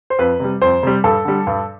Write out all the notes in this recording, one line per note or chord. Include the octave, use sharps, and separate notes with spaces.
C5
F2 B4
C3 G3
F2 C5
C3 G3
G2 A4
D3 G3
G2